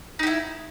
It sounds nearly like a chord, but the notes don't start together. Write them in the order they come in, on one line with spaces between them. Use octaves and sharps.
D#4 G4 E4